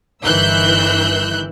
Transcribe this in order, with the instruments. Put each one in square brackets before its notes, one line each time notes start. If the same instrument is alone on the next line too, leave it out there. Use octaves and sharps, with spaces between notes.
[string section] G1 D#3 E3 E6 F#6 G6